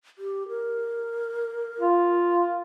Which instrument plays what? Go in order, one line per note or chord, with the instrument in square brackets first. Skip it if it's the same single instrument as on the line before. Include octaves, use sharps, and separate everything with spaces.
[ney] G4
A#4
[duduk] F4